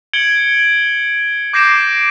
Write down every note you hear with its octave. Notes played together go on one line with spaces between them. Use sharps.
G#6 C#7 D7 F#7 G7
D6 G6 A#6 C7 D7 E7